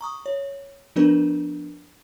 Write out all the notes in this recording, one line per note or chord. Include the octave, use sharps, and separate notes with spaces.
A#5 C#6 D#6
C#5
F3 B3 D4 A#4 B4